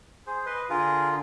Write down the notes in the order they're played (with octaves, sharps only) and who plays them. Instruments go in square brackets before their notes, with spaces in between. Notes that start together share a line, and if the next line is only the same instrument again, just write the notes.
[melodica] G#4 C5
[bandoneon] B4 [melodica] D#5 C6
[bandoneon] D3 F4 [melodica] G#4 A#4